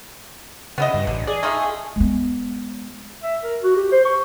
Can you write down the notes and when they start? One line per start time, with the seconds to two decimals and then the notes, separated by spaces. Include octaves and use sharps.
0.78 C#3 B3 E4 D#5
0.94 G2
1.07 A1 D3
1.27 G#4 D5
1.43 A3 D#4 F4
1.96 G#3 B3
3.23 E5
3.43 A#4
3.63 F#4
3.76 G4
3.92 C5
4.05 C#6